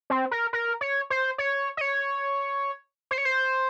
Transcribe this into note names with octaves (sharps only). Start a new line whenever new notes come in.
C4
A#4
A#4
C#5
C5
C#5
D#5
C#5
C5
C#5
C5